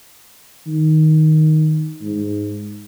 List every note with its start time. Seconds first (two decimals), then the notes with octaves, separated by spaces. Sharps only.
0.67 D#3
2.02 G#2